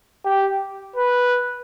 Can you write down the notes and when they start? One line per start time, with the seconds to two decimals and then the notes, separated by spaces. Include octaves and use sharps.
0.25 G4
0.96 B4